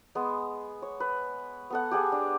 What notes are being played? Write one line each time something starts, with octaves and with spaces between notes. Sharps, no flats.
G#3 B3
C#5
B4
B3 A4 F#5
G4 G#4 F#5 G#5
D4